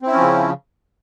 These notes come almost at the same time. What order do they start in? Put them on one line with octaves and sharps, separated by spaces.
C4 E4 C#4 F3 C#3